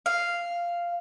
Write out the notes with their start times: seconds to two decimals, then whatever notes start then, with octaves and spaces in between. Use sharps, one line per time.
0.06 F5